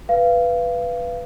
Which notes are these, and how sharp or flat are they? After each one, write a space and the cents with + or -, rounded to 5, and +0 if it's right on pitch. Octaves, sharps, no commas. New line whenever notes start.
B4 +0 F5 -25